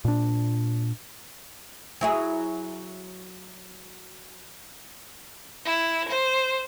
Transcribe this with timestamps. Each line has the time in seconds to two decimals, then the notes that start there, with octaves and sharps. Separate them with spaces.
0.05 A#2 D4
2.01 F#3 E4 G#4
5.65 E4
6.09 C5